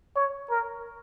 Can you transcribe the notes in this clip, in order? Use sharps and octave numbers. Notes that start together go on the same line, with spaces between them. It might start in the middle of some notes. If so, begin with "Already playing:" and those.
C#5
A#4